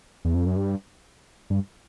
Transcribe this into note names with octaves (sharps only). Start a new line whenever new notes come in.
E2
F2
F#2
G2
G2